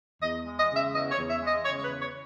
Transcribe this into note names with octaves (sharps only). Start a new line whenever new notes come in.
E2 D#5
G#3
D#5
C#3
E5
E2 D#5
C#5
E2
E5
G#3
D#5
C#3 C#5
C#5
B4
E2
C#5